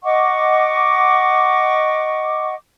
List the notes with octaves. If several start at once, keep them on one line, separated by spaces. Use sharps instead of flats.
D#5 F#5 C#6 D6